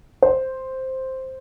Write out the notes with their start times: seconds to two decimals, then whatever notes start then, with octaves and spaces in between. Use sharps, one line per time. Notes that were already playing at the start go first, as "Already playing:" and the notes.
0.22 C5